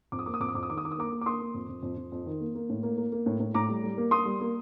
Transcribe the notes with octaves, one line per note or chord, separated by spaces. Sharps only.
F2 D6
D#6
A#3 D6
D#6
F2 D6
D#6
F2 D6
D#6
D#3 D6
D#6
D#3 D6
D#6
A#3 A#5 D6
A#3
D6
A#3 C6 D#6
A#3
F2
F2
F2
F2
F2
D#3
A#3
A#3
A2
A#3
A#3
A#3
A2
A2
A2 A#5 D6
G3
G3
A#3
A#3 C6 D#6
G3
A#3